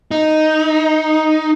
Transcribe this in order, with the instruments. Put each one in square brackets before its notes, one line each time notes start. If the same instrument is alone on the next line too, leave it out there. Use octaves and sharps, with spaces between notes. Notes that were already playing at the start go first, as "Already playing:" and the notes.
[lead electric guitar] D#4